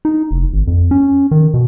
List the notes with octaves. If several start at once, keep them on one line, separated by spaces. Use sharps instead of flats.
D#4
F1
G#1
F2
C#4
D#3
B2